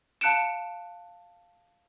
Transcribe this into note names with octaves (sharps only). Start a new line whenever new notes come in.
F5 A5 F#6 C#7 D7 E7